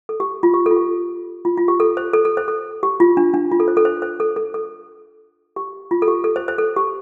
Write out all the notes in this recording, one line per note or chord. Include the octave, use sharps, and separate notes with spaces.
A4
G4
F4
G4
A4
F4
G4
F4
F4
G4
A4
C5
A4
A4
C5
A4
G4
F4
D4
D4
F4
A4
C5
A4
C5
C5
A4
A4
A4
G4
F4
A4
G4
A4
C5
C5
A4
G4